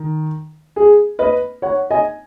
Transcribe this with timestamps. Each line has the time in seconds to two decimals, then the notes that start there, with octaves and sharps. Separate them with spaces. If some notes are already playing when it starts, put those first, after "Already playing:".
Already playing: D#3
0.76 G#4
1.19 B4 D#5
1.62 C#5 F#5
1.90 D#5 G#5